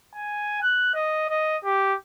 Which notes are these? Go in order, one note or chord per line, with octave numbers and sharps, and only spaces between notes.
G#5
F#6
D#5
D#5
G4